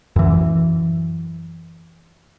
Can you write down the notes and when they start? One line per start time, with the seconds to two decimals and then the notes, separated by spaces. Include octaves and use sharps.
0.16 F#2 E3